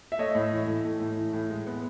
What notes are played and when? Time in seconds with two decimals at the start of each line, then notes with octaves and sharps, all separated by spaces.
0.12 E5
0.18 A3 C#5 D#5
0.35 A2
0.52 E3
0.68 A2
0.84 A3
1.00 A2
1.17 E3
1.33 A2
1.50 G#3
1.67 B3